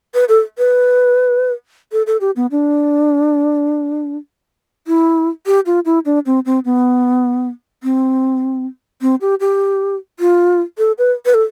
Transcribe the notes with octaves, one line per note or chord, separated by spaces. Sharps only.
B4
A4
B4
A4
A4
G4
B3
D4
E4
G4
F4
E4
D4
C4
C4
B3
C4
C4
G4
G4
F4
A4
B4
B4
A4